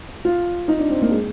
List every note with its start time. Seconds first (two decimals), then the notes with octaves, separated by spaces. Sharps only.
0.25 F4
0.68 D#4
0.79 D4
0.90 C4
1.02 A#3
1.11 G#3